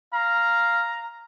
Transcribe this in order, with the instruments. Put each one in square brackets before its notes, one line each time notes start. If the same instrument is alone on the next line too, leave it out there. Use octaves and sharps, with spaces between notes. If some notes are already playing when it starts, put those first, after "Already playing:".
[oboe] F5 [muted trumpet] A#5